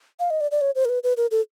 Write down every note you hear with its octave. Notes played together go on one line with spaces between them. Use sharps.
F5
D#5
D5
D5
C#5
C5
A#4
B4
B4
A#4
A4